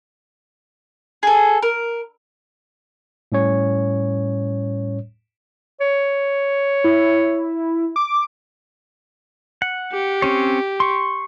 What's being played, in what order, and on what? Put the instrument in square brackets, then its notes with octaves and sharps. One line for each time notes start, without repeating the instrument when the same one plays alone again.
[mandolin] G#4 A4
A#4
[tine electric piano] A2 G3 C#4 C#5
[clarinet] C#5
[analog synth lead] E4
D6
[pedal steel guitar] F#5
[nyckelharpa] G4
[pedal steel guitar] C4 C#4 C#5
C6 C#6